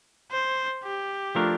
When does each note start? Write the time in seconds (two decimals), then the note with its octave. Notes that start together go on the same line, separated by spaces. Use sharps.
0.32 C5
0.83 G4
1.35 F3 A3 D4 F4 A#4